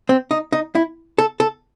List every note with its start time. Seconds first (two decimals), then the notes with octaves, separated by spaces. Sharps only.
0.09 C4
0.31 D#4
0.52 D#4
0.75 E4
1.18 A4
1.40 A4